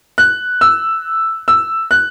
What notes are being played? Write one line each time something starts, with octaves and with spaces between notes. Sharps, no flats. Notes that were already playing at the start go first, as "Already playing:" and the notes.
F#6
E6
E6
F#6